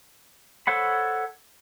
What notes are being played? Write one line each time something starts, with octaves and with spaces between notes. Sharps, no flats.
A4 C5 C#5 F#5 B5